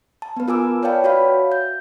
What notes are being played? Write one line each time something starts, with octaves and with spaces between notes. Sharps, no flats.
A5
B3 B4
F4 A#4 G#5 D6 E6
B4 C#5 D5 F5 G5 A5
F#4 C#5 E5 F5 B5
G6